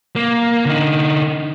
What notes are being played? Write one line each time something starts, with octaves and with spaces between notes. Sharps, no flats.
A#3
D3 D#4